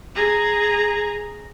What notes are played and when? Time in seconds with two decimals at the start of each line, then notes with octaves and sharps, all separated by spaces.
0.15 G#4 A#5